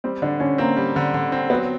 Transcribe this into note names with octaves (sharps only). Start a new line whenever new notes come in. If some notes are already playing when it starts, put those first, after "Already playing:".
G3 C4
D3 D4
D3 C#4
A#3 C4
G3
D3
D3
C4
F#3 B3